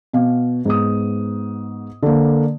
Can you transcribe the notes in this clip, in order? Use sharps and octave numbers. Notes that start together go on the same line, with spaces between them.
B2 F5
G#2 B3 D#6
D3 A#3